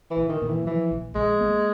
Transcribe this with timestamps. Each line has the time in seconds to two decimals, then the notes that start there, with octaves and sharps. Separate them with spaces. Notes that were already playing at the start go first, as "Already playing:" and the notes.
0.11 E3
0.16 A#1
0.29 D#3
0.42 A#2
0.48 E3
0.66 E3 F3
0.91 A#1
1.15 A#1 G#3
1.41 A#3